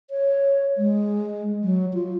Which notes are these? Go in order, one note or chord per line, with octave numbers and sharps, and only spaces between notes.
C#5
G#3
F#3
F4